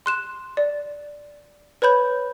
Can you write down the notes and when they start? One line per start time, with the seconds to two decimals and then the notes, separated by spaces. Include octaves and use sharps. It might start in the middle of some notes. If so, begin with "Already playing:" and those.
0.06 C6 F#6 E7
0.57 D5
1.82 B4 C#5 B5 G6